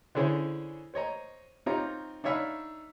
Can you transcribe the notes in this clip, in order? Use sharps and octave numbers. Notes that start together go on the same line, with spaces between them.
D3 C#4 E4 G#4 C5 C#5
C5 C#5 D#5 A#5
C4 D#4 F4 G4 C#5 A#5
D4 D#4 C#5 E5 F5 B5